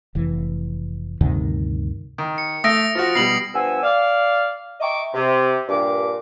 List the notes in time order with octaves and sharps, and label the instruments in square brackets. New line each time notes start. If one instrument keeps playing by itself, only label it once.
[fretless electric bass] F1 E3
D2 G2 C3 D#3
[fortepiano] D#3
[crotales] C#7
[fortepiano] A3 E5 [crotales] D#6 A#6 D7
[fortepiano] F3 F4 F#4
[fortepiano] B2 G3 [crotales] C7 F#7
[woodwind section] G2 F3 B3 G#5 E6
D5 F5
D#5 E5 G5 A#5 C#6 D6
C3
G2 A#2 D6